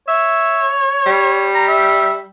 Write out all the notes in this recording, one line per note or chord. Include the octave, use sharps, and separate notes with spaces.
C#5 E5
G3
A#5
E5